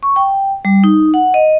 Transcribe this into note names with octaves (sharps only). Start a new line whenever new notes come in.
C#6
G5
G3
D#4
F#5
D#5